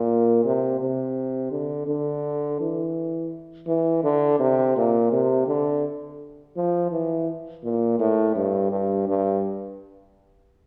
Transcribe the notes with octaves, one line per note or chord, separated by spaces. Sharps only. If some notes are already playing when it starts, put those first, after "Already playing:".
Already playing: A#2
C3
C3
D3
D3
E3
E3
D3
C3
A#2
C3
D3
F3
E3
A#2
A2
G2
G2
G2